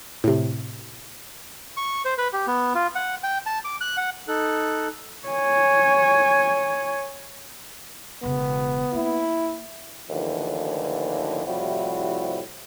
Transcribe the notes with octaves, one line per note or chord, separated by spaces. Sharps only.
A2 C3
C#6
C5
B4
G4
B3
F4
F#5
G5
A5
D6
F#6
F#5
D#4 A4 F#6
C#5 G#5
E1 C#3 B3
A#3 E4
A1 D#2 D3 E3 F3
A2 C3 F3 G3 E4 F#4